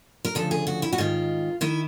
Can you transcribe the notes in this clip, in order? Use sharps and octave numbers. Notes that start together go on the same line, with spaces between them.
A#4
D2 C#3 F3 A4
G#4
F#4
E4
F#4
G#2 D#3 F4
D#3 E4